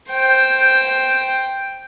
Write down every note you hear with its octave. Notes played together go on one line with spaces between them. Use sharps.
C5 G5